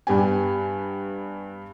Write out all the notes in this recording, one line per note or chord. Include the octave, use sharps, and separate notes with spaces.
G2 G3 B3 G4 G#5